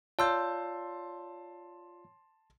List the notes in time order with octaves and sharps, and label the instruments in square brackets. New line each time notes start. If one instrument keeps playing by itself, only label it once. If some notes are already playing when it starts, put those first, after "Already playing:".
[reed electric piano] F4 D5 F5 [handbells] C#5 E6 G6 [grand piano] A5 C6